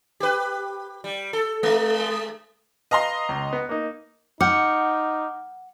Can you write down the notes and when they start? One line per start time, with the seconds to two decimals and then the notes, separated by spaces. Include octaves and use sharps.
0.20 G4 B4
1.04 G3
1.33 A4
1.63 G#3 A3
2.91 B4 D#5 F5 A#5 C6
3.29 C#2
3.53 B3
3.69 A#3 D#4
4.41 D#4 F#5 D6 F6 G6